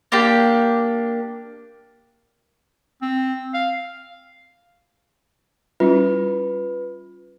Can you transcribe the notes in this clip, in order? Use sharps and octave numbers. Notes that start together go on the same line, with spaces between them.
A#3 D4 G4
C4
F5
G3 C#4 E4 F4 B4